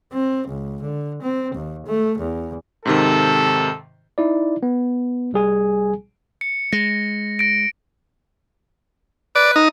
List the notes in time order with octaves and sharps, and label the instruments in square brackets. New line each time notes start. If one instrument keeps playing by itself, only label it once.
[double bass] C4
C#2
D3
C4
D#2
A3
E2
[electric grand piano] G#2 C3 D#3 [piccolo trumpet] A4
[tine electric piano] D#4 E4 D5
B3
C2 G3 G#4 G#5
[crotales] C#7
[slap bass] G#3 [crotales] A#6
[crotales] A#6 D7
[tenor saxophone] B4 [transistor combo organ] D5
[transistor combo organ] D#4